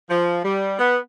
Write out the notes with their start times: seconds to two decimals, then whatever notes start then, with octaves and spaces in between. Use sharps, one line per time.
0.10 F3
0.44 G3
0.79 B3